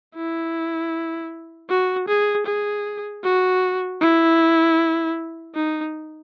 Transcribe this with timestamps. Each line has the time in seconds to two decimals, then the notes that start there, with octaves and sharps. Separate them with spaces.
0.15 E4
1.70 F#4
2.08 G#4
2.46 G#4
3.24 F#4
4.01 E4
5.55 D#4